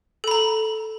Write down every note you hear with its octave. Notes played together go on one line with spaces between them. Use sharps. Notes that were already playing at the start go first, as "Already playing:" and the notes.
A4 A#5 B5